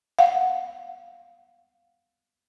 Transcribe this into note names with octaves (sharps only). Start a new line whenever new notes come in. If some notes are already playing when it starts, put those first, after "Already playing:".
F5 F#5